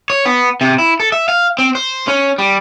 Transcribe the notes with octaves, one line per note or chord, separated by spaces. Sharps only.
C#5
B3
C3
E4
A4
E5
F5
C4
C5
C#4
G3